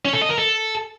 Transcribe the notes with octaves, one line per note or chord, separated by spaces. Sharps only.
C#4
A4
D#5
A#4
A4